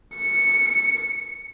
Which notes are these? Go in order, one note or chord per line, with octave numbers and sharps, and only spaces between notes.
C#7